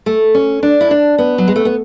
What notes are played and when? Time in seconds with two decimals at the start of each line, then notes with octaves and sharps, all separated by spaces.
0.06 A3
0.35 C#4
0.63 D4
0.81 E4
0.91 D4
1.18 B3
1.38 F#3
1.48 G#3
1.56 A3
1.65 B3